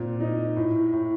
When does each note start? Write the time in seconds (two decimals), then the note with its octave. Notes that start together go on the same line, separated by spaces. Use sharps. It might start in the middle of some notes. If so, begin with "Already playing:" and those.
Already playing: A#2 C4
0.20 D#4
0.56 A2
0.92 A2